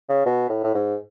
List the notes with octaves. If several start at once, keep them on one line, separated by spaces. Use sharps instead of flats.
C#3
B2
A2
A2
G#2